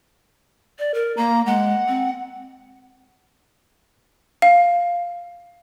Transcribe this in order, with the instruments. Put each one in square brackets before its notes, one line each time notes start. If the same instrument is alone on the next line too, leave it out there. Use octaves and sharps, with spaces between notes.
[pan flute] D5
A#4
[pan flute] A#3 [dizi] A#5
[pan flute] G#3 [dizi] F#5
[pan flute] C4
[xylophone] F5